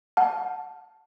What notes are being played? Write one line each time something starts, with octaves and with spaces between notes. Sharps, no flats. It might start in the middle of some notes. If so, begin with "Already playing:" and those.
F#5 A5